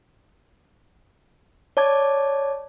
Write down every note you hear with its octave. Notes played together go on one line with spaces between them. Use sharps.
C#5 D5 A5 D6 G#6